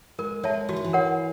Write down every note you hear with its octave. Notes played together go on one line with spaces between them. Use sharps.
G#3 A#4
G#3 C#5 E5 A5
E3 F#4
D#3
E3
A#4 C#5 F#5